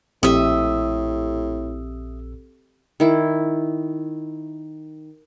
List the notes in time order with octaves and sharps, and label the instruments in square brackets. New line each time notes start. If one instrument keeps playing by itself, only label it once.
[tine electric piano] A#1 E6 [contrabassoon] A2 [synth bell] C4 G4 A4 [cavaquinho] D#5 E5
[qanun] D#3 E4